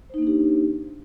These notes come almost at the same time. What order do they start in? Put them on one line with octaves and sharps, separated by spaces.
C5 D#4 A#3 D4 G4